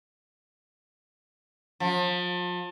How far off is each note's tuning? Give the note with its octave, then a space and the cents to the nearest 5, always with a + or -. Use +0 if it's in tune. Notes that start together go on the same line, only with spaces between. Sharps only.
F3 +35